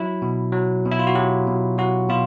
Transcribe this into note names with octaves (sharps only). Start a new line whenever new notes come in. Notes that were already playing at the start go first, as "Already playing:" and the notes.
Already playing: F#3 E4
B2
F#3
B2
E4
F4
F#4
F#3 G4
B2
F#3 F#4
B2 F4